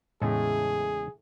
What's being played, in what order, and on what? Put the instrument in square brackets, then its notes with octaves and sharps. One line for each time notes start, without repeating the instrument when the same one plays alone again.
[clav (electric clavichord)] E2 C#3 G#3 [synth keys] A2 [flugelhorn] G#4